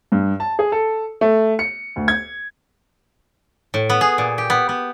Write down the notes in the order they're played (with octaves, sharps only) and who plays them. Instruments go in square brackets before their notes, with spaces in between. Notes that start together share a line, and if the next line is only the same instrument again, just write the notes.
[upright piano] G2
A5
G#4
A4
A3
C#7
D2
G#6
[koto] A2
B3
G#4
A#2
G4
B3
B3